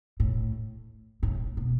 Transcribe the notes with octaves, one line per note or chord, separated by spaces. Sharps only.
A2
A2
B2